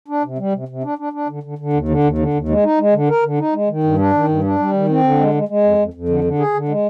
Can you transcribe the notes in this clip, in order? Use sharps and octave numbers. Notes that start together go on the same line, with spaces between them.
D4
C3
G3
C3
C3
D4
D4
D4
D3
D3
D3
D#2
D3
D#2
D3
D#2
G#3
D#4
G#3
D3
A#4
D3
D#4
G#3
D#3
G2
D4
D#3
G2
D4
G3
D#3
C4
D3
G#3
G#3
G#3
F2
F2
F2
D3
D3
G#4
D3
G#3